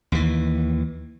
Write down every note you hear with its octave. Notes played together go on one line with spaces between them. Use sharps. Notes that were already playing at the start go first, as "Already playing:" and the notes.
D#2 E3